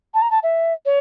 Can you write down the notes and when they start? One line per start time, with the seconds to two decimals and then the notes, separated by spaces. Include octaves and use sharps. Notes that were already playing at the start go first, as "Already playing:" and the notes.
0.14 A5
0.22 A#5
0.31 A5
0.43 E5
0.85 C#5